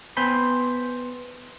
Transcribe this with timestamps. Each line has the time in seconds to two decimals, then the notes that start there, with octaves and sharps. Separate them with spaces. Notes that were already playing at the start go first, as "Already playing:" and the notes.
0.17 B3 C5 G5 G#5 B5